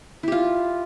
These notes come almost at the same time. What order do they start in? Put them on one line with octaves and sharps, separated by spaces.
E4 G4 F4